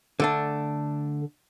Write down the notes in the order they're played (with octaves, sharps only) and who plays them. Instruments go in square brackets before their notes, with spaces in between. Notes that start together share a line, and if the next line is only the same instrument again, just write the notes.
[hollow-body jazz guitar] D3 A3 D4